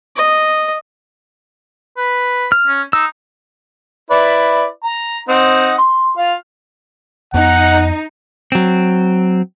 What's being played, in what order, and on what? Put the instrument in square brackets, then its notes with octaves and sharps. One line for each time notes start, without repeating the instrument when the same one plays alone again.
[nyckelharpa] D#5
[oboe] B4
[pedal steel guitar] F6
[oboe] C#4
[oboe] D#4 [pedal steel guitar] E6
[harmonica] E4 B4 D5
A#5
C4 D#4 F#5
C6
F4 F5
[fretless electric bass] F2 B3 [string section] D#4 [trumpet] F#5
[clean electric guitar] F#3 C4